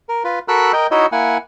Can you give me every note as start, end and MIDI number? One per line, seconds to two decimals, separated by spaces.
0.09 0.23 70
0.24 0.39 65
0.24 0.39 71
0.48 0.72 66
0.48 0.72 69
0.48 0.72 70
0.48 0.72 83
0.48 0.72 88
0.48 0.72 90
0.73 0.87 70
0.73 0.87 75
0.73 0.87 79
0.91 1.06 63
0.91 1.06 64
0.91 1.06 66
0.91 1.06 73
0.91 1.06 75
0.91 1.06 76
1.12 1.37 58
1.12 1.37 64
1.12 1.37 78
1.12 1.37 80